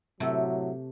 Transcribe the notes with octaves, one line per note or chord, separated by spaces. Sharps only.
A2 C3 F#3 A3